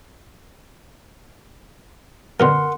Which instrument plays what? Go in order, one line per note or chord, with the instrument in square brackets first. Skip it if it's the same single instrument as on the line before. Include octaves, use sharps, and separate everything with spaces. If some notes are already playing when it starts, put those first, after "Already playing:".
[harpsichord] F#2 B2 D3 [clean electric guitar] A#4 F#5 C6